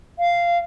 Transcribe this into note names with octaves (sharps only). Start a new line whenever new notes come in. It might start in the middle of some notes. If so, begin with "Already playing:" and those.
F5